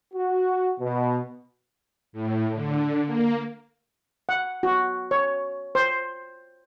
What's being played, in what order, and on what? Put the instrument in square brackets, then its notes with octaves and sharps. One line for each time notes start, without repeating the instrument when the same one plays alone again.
[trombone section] F#4
B2
[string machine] A2
D3
A#3
[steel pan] F#5
F#4
C#5
C5